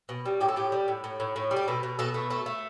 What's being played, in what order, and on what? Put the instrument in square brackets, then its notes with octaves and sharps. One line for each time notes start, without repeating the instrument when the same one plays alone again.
[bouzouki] B2
G3
A2 G4
A4
A2 G4
G3
A2
A2
A2
A2
G3
G4
B2 A4
B2
B2 A4
A3
A3 A4
A3